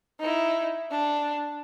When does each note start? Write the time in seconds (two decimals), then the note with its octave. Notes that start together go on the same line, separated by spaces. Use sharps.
0.21 D#4 E4
0.91 D4